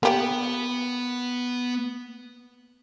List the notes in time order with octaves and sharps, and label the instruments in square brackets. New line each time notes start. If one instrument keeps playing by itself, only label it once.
[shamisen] A#3 G4 G5 [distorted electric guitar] B3